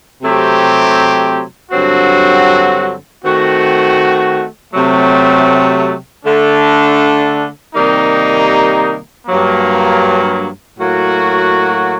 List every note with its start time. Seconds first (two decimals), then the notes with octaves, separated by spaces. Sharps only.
0.21 C3 F#3 A3 C4 G4
1.72 G2 D3 F#3 C4 F#4
3.23 D#3 A3 C4 F#4
4.74 C3 F#3 A3
6.25 D3 A3 D4
7.76 C3 D#3 G3 A#3 D#4
9.27 G2 F#3 A#3
10.78 A2 F#3 A#3 F#4